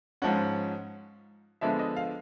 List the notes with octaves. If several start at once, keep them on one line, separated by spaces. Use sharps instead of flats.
G#2 F3 G#3 C#4 F#5
D3 F3 G#3 B3 D4 E5
D#5
F5